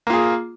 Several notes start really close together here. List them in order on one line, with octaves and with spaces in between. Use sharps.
A#3 F4 G#4